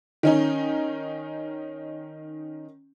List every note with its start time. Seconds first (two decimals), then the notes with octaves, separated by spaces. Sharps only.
0.23 D#3 C#4 D#4